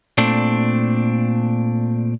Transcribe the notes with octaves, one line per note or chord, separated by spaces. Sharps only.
A#2 A3 C4 D4